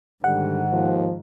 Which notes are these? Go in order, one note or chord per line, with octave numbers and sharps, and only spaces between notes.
G#2 D3 D#3 G3 F#5
D#2 F3